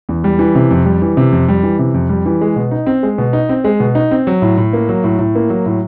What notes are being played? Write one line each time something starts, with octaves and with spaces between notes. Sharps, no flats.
E2
G3
E3
C3
F2
G3
E3
C3
F2
G3
E3
C3
F2
G3
E3
G#3
B2
D#4
C4
G#3
B2
D#4
C4
G#3
B2
D#4
C4
F#3
A2
A2
A#3
F#3
A2
A2
A#3
F#3
A2